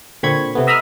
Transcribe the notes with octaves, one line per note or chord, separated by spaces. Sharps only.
A#2 D3 C4 B5 C#6 G#6
C3 A3 B3
D#5 E5 A#5 B5 D#6 F6